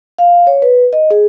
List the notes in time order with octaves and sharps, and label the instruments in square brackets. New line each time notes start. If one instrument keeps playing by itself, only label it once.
[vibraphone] F5
C#5
B4
D#5
G#4